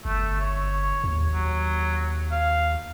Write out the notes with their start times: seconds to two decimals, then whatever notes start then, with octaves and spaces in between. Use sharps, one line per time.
0.05 G1 A3
0.41 C#5
1.04 D#2
1.35 F#3
2.31 F5